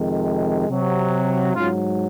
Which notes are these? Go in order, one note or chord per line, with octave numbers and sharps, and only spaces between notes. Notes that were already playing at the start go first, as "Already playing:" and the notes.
Already playing: F2 C3 D#3 G#3
C3 F#3
G#2 F#3 C#4 F4